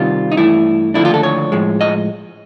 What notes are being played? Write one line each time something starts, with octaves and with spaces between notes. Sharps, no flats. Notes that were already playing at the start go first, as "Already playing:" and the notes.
Already playing: C3 D#3 G3 F4
D#4
G2 E3 A3 E4
D#2 D3 F3 A3 D4 E4
F4
A4
C#5
A2 F3 G#3
D#5